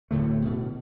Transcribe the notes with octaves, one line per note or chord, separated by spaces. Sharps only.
D1 A2 D3 A3
B2